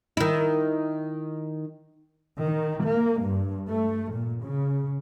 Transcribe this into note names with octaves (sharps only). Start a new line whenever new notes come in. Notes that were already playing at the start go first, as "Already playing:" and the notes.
D#3 E4
D#3
A#3
G2
A3
A#2
C#3